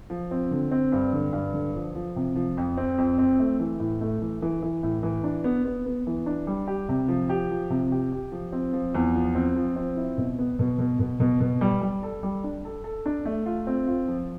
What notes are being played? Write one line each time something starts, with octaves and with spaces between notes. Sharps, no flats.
F3
C4
D3
C4
G2
D3
G2
D3
F3
F3
C3
F3
F2
C4
F2
C4
A3
E3
A2
A3
E3
E3
E3
A2
E3
D4
B3
B3
B3
E3
D4
G3
G4
C3
F3
G4
F3
C3
G4
G4
F3
C4
F3
E2
F3
C4
F3
C4
E4
B2
B3
B2
B2
B2
B2
B2
G3
G3
A4
G3
D4
A4
A4
D4
A3
F4
C4
F4
F3